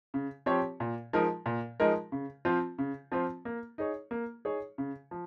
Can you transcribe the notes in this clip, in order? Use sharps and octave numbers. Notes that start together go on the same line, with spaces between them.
C#3
F3 C4 G4 C#5
A#2
F3 G#3 D#4 A#4
A#2
F3 G#3 D#4 A#4
C#3
F3 C4 F4 C5
C#3
F3 C4 F4 C5
A#3
D#4 G#4 C#5
A#3
D#4 G#4 C#5
C#3
F3